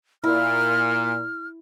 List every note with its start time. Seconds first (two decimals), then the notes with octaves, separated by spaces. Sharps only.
0.24 A#2 E4 F6